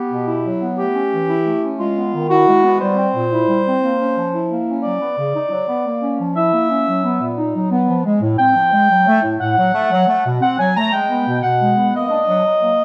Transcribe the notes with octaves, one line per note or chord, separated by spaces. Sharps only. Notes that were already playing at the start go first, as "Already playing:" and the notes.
Already playing: B3 G4
B2
E4
F#3
B3
A3 G4
C#4
E3
E4
A3
C#4
G#3 F4
B3
D#3
E4 F#4
G#3
B3
G3 C5
C4
A#2
E4
G3
C4
A#3
C#4
F3
E4
A#3
C#4
F#3 D5
B3
C#3
D#4
F#3
B3
A#3
C#4
F3
E4 E5
A#3
C#4
F#3
B3
A#2
D#4
F#3
B3
F3
G#3
A2
C4 G5
F3
G#3
F#3
A3
A2
A2 F#5
F#3
A3
F#3
A3
B2
C4 F#5
F#3 G#5
A3 A#5
G#3 G5
B3
B2
B2 F#5
G#3
B3
A#3 D#5
D4
F#3
F#3
A#3